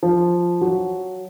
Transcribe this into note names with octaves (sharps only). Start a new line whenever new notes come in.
F3
F#3